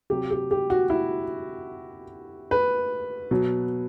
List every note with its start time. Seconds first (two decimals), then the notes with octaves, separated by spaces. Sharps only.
0.10 C3 F#3 G4
0.31 G4
0.51 G4
0.70 F#4
0.90 E4
2.51 B4
3.31 B2 F#3